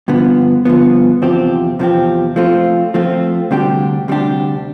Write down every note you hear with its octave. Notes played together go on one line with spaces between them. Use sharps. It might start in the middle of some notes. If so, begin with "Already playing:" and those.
G2 D3 F3 B3
G2 D3 F3 B3
E2 C3 F3 C4 G4
E2 C3 F3 C4 G4
F3 A3 C4 F4
F3 A3 C4 F4
D2 C3 G3 D4 G4
D2 C3 G3 D4 G4